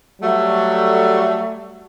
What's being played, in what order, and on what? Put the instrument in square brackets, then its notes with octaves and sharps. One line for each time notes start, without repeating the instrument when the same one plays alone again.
[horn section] F#3 G3 A3